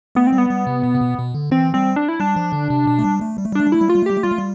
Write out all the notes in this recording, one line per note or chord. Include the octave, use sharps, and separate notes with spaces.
A3 B3
C4
G3
B3
G3
C3
B2
C3
B2
B2
D3
E3 C4
G3 C4
D4
E4
G3 D4
F3
D3
C3
B2
A3
G3
A3
G3
A3
G3
A3 D4
G3
A3 E4
G3
A3 F4
G3
A3
G3 G4
A3
G3 F4
A3
G3